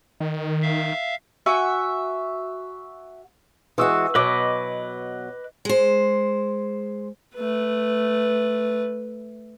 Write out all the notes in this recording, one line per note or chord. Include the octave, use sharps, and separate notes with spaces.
D#3
E5 F5
F#4 E5 F#5 G#5
E3 G#3 F#4 C#6 D#6 E6
B2 F#3 B4 D#5 D6
G#3 C5
A3 B4